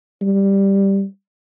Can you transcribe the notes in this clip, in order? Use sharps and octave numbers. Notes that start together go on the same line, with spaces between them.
G3